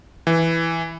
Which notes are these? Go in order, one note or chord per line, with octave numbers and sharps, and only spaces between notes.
E3